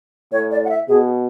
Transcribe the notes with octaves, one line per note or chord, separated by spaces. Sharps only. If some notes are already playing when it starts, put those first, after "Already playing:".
A2 C#5
D5
F#5
E5
B2 G#4